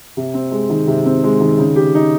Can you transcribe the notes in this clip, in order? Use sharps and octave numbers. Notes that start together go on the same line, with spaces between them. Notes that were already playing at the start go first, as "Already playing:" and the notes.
C3
C4
G#3
D#3
C3
C4
G#3
D#3
C#3
G4
D#4